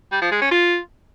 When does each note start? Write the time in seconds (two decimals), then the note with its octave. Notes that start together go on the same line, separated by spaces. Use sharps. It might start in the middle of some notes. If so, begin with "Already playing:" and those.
0.12 G3
0.22 F3
0.32 G#3
0.41 C#4
0.51 F4